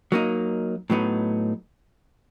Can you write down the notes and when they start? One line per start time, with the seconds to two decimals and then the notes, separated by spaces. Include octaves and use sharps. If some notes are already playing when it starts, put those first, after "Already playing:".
0.12 F#3 A#3 D#4
0.90 A2 F#3 B3 D#4